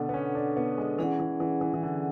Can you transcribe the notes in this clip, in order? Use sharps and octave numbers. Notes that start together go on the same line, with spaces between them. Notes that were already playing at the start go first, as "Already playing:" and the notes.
Already playing: B2 D3 D4 A4 D5 F#5
B3
C#4
D4
B3
G#3
E3 C#4 G#4 D5 F#5
E3
E3
E3
E3
D3